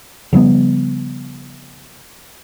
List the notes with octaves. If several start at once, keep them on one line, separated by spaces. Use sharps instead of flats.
C#3 F3 G3 B3